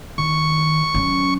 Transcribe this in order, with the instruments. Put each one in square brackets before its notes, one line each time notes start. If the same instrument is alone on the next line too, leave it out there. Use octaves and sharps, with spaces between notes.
[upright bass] D#3 [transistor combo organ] C#6
[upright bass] F#3 C#4